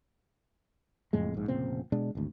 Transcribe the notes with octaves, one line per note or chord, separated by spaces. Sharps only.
F#1 F2 A2 G#3
A#1 G#2
F1 A#2 C#3 C4
B2 G#3 D4
G#1 D2